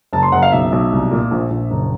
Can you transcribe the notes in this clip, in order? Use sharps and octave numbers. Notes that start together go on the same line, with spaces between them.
F#1 A5
C6
F#1 F#5
F5
B1 E5
B1
C2
A#2
A#1
A#1
F#1